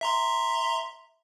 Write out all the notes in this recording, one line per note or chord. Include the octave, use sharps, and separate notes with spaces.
E5 A#5 C6